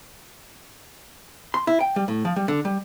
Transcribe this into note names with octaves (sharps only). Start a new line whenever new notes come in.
C6
E4
G5
G3
A2
F3
G3
D3
G3